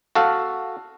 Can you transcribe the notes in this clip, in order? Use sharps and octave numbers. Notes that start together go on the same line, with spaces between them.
F#4 A4 F5